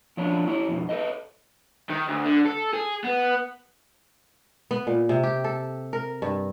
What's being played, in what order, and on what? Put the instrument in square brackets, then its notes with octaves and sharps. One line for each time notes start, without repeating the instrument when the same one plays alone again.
[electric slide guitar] F3 C#4 D4
C#4 E4 C#5
F2 B2
A4 B4 D#5
[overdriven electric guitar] D#3
D2
D3
A4
G#4
B3
[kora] B3
A#2
C3
G4
A4
A#4
G2